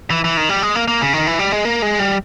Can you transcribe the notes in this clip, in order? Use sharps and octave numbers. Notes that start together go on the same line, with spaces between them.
E3
E3
D#3
G3
G#3
A#3
A#3
C#3
D#3
E3
G3
G#3
A#3
G#3
G3